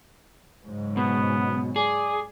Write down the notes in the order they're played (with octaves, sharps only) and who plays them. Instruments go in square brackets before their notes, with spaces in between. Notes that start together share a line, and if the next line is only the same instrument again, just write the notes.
[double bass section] G#2 C#3 F#3
[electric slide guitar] B2 [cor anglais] B3
[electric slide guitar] G#4 [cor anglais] D5